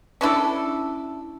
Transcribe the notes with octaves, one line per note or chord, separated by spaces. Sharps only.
C#4 D4 E4 A4